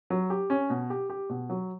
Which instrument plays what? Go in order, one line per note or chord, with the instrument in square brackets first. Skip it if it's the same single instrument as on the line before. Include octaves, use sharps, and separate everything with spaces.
[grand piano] F#3
G4
C#4
B2
G4
G4
B2
F#3